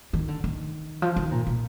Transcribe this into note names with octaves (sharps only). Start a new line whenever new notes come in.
D#3
D3
D#3
F3
D#3
A#2
A#2